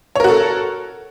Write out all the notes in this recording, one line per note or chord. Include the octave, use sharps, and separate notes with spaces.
F#4 A4 A#4 C#5